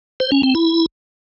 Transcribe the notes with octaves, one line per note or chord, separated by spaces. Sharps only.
C5
C#4
C4
E4